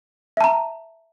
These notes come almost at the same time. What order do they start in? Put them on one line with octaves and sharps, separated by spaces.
E5 A5 A#5